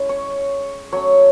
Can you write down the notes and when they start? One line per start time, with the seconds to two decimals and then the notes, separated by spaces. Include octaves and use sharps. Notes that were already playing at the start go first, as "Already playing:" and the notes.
Already playing: G#3 C#4 E4
0.09 C#5
0.92 F#3 A3 C#4 C#5